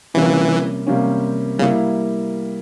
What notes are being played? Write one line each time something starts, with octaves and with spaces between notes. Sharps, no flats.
C3 E3 G3 A#3 C#4
C3 G3 A#3 C#4
C#3 G3 A#3 E4